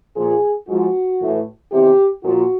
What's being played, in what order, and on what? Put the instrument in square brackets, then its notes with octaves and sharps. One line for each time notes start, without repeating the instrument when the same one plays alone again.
[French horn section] A#2 F3 G#4
G#2 F3 F#4
A2 E3
E2 C3 D#3 G4
A#2 F3 F#4